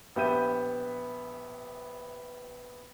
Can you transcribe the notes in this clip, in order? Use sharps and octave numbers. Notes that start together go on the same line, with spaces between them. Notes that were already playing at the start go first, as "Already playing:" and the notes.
A#1 B3 G4 E5 G6 D#7